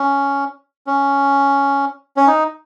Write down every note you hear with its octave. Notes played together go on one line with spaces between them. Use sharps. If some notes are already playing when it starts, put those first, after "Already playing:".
Already playing: C#4
C#4
C#4
D#4